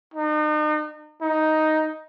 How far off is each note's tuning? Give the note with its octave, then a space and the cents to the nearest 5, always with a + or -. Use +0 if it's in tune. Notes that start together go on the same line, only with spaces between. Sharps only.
D#4 -40
D#4 +5